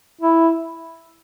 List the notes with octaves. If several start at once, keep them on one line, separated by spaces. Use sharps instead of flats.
E4